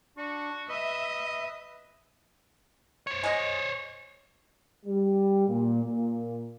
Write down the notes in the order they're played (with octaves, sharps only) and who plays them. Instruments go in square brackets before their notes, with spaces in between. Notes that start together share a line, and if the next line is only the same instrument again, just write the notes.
[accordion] D4 C#6 [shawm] F#4
[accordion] B4 [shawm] D#5 [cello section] E5
[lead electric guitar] C5 C#5
[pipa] G#3 D#5
[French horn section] G3
A#2
A#2